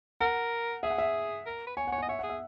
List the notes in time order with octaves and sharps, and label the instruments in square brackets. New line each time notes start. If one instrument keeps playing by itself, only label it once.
[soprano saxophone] A#4 [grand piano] F#5
[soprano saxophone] G#4 [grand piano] E5
[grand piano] F#5
E5
[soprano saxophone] A#4
B4
[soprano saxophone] C#5 [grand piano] G#5
[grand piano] F#5
[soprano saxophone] C#5 [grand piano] G#5
[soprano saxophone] D#5 [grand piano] F#5
[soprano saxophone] C#5 [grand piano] E5
[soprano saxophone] G#4 [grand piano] F#5
[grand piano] E5